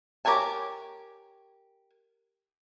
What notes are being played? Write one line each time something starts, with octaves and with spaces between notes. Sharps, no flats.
G4 A#4 C#5 G#5 A5